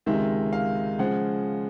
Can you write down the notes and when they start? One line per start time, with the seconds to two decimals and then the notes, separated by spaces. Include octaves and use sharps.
0.06 C#2 C3 D#3 G#3 E5
0.53 F5
0.99 C#3 F3 G#3 F#5